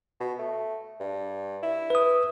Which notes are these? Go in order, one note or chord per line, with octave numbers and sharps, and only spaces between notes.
B2
A3
G2
E4
B4 D#6